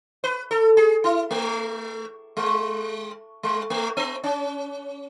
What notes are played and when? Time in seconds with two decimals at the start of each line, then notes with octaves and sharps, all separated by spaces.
0.24 B4
0.51 A4
0.77 G#4
1.04 E4
1.31 A3
2.37 G#3
3.43 G#3
3.70 A3
3.97 B3
4.24 C#4